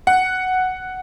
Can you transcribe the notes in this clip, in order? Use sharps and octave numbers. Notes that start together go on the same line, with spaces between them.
F#5